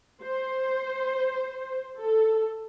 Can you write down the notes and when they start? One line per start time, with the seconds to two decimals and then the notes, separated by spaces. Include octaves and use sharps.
0.23 C5
1.97 A4